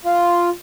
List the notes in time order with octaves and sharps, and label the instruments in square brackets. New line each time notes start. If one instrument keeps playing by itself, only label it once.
[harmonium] F4